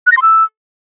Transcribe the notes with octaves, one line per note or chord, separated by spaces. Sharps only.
F#6
A#6
C6
E6